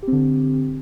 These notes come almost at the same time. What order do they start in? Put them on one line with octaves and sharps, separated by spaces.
G4 C4 D3